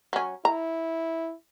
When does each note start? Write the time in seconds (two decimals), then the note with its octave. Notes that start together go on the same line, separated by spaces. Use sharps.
0.13 F#3 C#4
0.45 E4 A#5